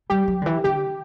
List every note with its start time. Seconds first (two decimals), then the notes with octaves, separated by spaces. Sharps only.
0.10 G3 G4
0.28 F#3
0.42 D3
0.46 E3
0.64 D3 G4